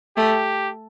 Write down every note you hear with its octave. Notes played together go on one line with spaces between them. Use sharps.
A3 G4